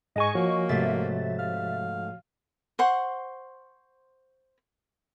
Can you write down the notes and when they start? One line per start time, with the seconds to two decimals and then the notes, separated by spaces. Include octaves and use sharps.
0.16 G#2 G#3 G#4 D#5 G#5 C#6 G#6
0.35 F3 A#3 F#4 C#5
0.69 G#2 C3 A3 C4 E5 A6
1.39 F5
2.79 C5 F#5 C6 C#6